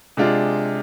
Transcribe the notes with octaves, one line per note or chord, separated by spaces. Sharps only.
C3 G#3 D4 F4 G#4